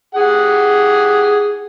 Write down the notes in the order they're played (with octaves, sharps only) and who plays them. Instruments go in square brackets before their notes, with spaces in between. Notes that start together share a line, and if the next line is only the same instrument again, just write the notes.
[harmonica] G4 G#4 F#5